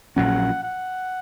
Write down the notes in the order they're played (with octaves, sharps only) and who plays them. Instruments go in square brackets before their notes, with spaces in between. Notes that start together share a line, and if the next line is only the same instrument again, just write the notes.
[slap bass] A#1 A#2 F#3 C#4 [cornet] F#5
[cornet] F#5